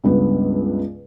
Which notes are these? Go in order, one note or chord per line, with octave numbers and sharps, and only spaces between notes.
C#2 G2 B3 B4